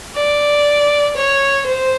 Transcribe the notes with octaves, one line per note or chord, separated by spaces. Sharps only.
D5
C#5
C5